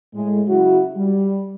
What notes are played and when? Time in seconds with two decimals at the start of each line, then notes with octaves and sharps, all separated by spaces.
0.14 A2 G#3
0.48 C#3 F#3 E4 F#4
0.96 G3